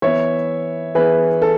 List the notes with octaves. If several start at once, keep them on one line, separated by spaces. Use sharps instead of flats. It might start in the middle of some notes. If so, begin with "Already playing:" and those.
E3 B3 C#5 E5
E3 B3 G#4 B4
A4